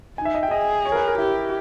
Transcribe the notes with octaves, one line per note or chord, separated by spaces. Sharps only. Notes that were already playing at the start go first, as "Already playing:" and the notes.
D#4 G#5
E5
D#5
G5
G#4 D#5
C#5
A#4
B4
A#4
E4 G4